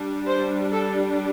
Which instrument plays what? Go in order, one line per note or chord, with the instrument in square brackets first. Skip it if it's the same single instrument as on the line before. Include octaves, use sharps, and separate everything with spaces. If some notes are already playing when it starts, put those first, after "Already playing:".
Already playing: [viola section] G3 D4
C5
A4